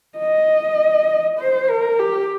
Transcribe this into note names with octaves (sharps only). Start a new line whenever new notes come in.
D#5
C5
A#4
G4